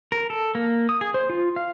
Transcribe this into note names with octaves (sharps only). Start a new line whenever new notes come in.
A#4
A4
A#3
D#6
G#4
C5
F4
F5